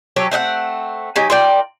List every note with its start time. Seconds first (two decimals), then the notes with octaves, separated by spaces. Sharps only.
0.16 F#3 G4 A4 C#5
0.31 A3 C4 D#5 F#5
1.16 F#3 D#4 G4 G#5
1.30 F4 A#4 D5 G5